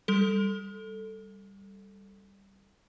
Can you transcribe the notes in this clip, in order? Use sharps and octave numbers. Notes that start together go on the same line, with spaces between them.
G3 A4